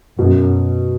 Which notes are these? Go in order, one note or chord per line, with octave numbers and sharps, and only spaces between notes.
F#2 B2